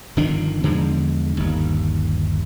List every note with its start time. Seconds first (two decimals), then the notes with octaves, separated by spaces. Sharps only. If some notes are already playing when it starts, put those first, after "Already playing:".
0.17 G1 D#3 F3 D4
0.64 E2 D3 F3 G#3
1.37 G1 D#2